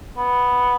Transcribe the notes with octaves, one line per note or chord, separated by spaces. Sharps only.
B3